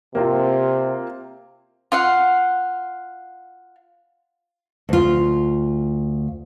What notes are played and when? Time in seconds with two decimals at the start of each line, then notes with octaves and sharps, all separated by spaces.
0.15 C3 A#3 C4 F4
1.92 F4 F5 F#5
4.89 D2 F4